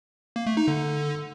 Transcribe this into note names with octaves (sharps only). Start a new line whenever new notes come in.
A#3
A3
D#4
D3